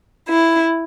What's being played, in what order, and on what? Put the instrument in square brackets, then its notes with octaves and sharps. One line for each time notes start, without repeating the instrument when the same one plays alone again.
[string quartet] E4